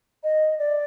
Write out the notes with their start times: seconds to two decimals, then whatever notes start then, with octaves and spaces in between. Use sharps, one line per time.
0.23 D#5
0.58 D5